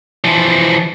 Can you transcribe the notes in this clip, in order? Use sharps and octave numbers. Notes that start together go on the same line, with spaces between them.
E3 F3